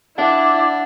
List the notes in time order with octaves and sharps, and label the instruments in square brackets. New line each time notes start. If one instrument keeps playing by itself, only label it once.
[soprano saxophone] D4 [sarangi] E4 [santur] F#5 [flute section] D6